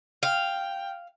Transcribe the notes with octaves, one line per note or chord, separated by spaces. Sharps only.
F5 G5